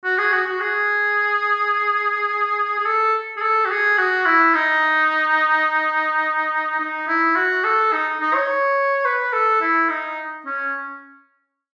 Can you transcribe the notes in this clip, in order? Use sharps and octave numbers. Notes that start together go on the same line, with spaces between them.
F#4
G#4
F#4
F#4
G#4
G#4
A4
G#4
A4
F#4
G#4
F#4
E4
D#4
D#4
E4
F#4
A4
D#4
D#4
C#5
B4
A4
E4
D#4
C#4